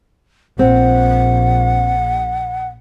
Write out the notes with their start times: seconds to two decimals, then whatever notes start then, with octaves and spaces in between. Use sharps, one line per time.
0.59 A#1 C4 F#5